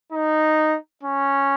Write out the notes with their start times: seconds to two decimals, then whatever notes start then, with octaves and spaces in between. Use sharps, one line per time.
0.12 D#4
1.03 C#4